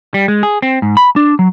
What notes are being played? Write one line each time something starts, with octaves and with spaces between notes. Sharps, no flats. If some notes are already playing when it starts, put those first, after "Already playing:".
G3
G#3
G#4
C4
G#2
B5
D4
F#3